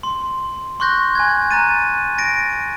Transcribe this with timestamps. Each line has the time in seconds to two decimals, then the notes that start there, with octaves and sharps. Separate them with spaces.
0.03 C6
0.80 C6 C#6 F#6 G6 A#6
1.15 G#5 F#6 G#6
1.51 A#5 F#6 A6 D#7
2.18 A6 A#6 D7